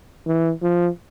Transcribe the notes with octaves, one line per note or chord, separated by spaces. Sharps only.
E3
F3